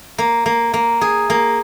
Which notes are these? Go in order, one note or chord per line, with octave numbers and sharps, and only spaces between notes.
A#3
A#3
A#3
G#4
A#3